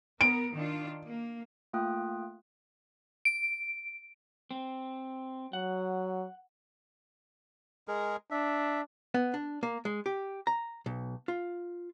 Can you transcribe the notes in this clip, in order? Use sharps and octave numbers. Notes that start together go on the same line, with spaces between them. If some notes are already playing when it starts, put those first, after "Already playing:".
B3 A#4 D7
D#3 D4 F4
A#3
A3 A#3 F4 G5 D#6 F#6
D7
C4
F#3 F#5
G#3 G#4 A#4
D4 E5
B3
D4
A#3
G#3
G4
A#5
B1
F4